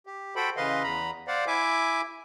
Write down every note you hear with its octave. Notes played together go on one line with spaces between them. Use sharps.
G4
F#4 A4 C5 G5 B5
C#3 E3 B4 D#5 F5 C6
E2 A#5 B5
C5 D5 F5 F#5
E4 E5 G#5 D6